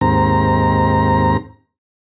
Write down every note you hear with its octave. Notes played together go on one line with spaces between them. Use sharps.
D#2 G#2 C4 A#5